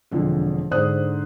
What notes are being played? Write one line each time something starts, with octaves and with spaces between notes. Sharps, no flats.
E1 F2 D3 F4
G#2 D3 D4 C5 D#6 F#6